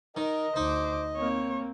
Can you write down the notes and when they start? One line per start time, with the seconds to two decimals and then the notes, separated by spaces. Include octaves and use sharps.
0.17 D#3 A#4 D#5
0.56 D2 D#4 C5 D6
1.16 A#3 C4 C#5